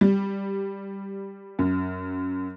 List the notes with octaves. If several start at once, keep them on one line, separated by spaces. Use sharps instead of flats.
G3
F#2